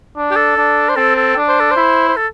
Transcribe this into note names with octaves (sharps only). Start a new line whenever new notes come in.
D4
G4
A4
D4
C5
C4 A4
A4
D4
C5
A4
E4 C5
C5
A4